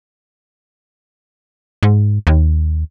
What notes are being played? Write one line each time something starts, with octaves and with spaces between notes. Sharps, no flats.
G#2
D#2